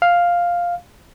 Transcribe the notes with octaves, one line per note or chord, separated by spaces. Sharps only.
F5